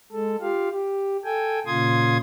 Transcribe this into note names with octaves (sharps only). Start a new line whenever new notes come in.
G#3 A4
F4 G4 F5
G4
A4 G5 G#5
A#2 C#3 F4 C6 D#6 G#6